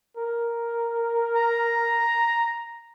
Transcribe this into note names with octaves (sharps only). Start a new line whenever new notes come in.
A#4
A#5